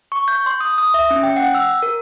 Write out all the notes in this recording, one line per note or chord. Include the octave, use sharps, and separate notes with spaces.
C#6
G6
C6
D#6
D#6
E5
C#4
G5
F#5
E6
A#4